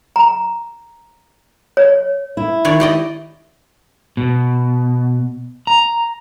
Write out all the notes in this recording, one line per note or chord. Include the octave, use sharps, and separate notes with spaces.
A#5
C#5
E4
D#3 C#5 D5
G4 D5 D#5
B2
A#5